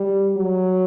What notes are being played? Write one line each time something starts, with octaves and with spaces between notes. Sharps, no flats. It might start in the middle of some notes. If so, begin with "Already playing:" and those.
Already playing: G3
F#3